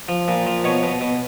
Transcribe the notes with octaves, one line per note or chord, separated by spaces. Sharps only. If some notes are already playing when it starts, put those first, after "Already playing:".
F3
A#2
F3
B2 C#5
B2
B2